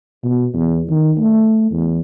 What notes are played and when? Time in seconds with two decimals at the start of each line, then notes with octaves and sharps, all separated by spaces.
0.24 B2
0.54 E2
0.90 D#3
1.18 A3
1.72 E2